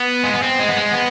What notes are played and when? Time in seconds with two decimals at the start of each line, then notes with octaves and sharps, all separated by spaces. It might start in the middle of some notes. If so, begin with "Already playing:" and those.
Already playing: B3
0.24 G#3
0.34 B3
0.43 C4
0.60 G#3
0.68 B3
0.77 G#3
0.93 B3